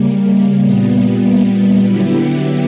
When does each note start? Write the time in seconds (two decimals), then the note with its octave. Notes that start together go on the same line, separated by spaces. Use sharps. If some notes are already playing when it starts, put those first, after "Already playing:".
Already playing: C#3 G3 A#3
0.63 A#2 G3 B3
1.84 D3 F#3 B3 E4 G4